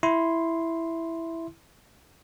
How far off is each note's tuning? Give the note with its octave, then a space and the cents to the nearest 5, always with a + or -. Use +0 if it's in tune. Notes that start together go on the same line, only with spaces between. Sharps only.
E4 +0 C6 +0